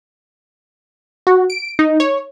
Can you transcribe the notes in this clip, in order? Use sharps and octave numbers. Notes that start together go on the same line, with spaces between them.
F#4
D7
D#4
C#5